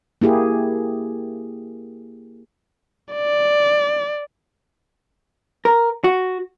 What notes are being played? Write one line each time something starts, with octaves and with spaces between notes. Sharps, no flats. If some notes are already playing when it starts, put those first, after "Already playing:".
A#3 E4 G4 G#4
D5
A#4
F#4